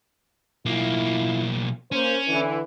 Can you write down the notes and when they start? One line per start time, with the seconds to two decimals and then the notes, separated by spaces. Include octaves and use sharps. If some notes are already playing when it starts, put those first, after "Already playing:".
0.66 B1 A#3 E4 F4
1.92 A#3 C#4 C5
2.28 D3 E3